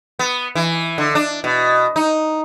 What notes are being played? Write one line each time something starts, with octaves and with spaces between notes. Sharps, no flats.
B3
E3
D3
D4
B2
D#4